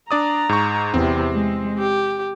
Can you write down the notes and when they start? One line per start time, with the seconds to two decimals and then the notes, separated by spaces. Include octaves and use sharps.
0.11 D4 D5 A#5 D#6
0.49 G#2 C#6
0.94 E2 C3 C4
1.32 G#3
1.78 G4